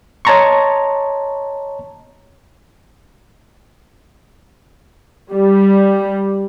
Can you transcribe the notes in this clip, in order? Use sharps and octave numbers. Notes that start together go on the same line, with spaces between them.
C#5 D#5 A5 A#5 C6 C#6
G3